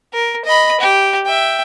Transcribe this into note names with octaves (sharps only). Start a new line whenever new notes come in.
A#4
D#5 B5
G4
E5 G5